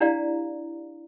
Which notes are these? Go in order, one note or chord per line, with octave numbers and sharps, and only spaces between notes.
D4 E4 G4 D5 F5 A#5